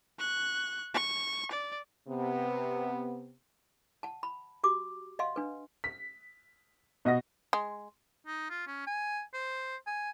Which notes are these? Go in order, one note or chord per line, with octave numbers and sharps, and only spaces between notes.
C#6 F#6
C#6
D5
C3 B3
F#5 A5
B5
F#4 G4 D6
D#5 F5 F#5 C6
D4 B4
B6
B2 D#5 F#5 A#6
G#3
D#4
F4
C#4
G#5
C5
G#5